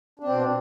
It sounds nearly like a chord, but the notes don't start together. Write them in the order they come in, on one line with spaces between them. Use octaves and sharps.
D4 C4 B2